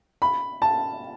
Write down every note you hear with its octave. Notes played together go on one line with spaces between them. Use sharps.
B5
A5